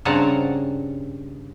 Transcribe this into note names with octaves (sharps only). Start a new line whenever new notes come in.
G2 C#3 C4 F#5 A5 A#5